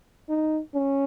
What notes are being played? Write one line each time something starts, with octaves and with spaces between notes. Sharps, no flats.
D#4
C#4